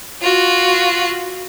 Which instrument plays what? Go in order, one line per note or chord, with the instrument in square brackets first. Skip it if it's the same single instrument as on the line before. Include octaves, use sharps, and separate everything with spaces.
[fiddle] F4 F#4